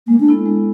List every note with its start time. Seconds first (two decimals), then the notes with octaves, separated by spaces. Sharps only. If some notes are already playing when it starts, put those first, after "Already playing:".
0.07 G#3 A#3
0.20 D4
0.27 B3 E4 A4
0.46 G#3